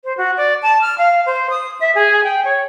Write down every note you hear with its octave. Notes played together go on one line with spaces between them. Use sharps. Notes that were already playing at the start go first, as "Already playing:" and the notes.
C5
F#4
D5
A5
F6
F5
C5
D#6
E5
G#4
G5
C#5